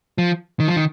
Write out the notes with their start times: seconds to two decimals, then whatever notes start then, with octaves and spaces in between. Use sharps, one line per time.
0.18 F3
0.60 D#3
0.68 F3
0.76 D#3